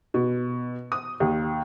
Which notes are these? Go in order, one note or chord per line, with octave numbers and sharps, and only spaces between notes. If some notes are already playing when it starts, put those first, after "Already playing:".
B2
D#6
D#2